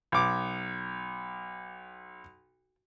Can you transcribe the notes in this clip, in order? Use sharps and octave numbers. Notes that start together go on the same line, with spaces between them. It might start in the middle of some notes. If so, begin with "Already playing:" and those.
B1 D6